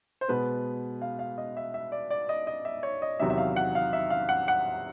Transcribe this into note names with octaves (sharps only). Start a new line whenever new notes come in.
C5
B2 G#3 B3 B4
F5
F5
D#5
E5
E5
D5
D5
D#5
D#5
E5
C#5
D#5
E2 C3 D#3 F#3 E5
E5
F5
F#5
F5
E5
F5
F#5
F#5